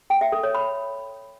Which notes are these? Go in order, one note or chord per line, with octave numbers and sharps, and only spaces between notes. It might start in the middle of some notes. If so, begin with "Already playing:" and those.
G5
E5
A4
C#5
B5